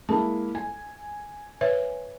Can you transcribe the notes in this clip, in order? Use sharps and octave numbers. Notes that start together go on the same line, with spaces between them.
G#3 A#3 E4 A5
G#5
B4 C#5 E5